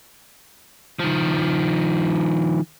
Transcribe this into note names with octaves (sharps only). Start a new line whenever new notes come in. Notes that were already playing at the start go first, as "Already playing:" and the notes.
D#3 F3